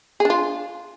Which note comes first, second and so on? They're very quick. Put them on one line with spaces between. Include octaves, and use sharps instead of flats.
G#4 D4 F4